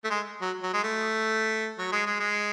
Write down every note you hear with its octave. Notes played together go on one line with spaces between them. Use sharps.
A3
G#3
F#3
F#3
G#3
A3
F#3
G#3
G#3
G#3